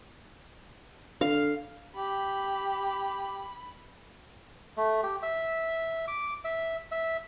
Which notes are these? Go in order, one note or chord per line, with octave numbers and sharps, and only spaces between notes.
D3 F5
G4 B5
A3
G4
E5
D6
E5
E5